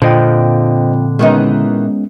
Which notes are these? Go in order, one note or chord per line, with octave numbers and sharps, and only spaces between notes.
F2 A#2 D3 C5 D#5 G5
D#3 E3 G#3 B3 C#4 D#4